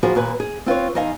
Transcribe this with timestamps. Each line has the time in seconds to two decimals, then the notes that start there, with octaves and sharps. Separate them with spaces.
0.03 D#3 F3 F4 F#4 G#4 B4
0.15 D#2 A#2 B4 G#5
0.40 G#4
0.66 C4 F4 B4 C#5
0.95 E2 D#4 D#5 F5 G#5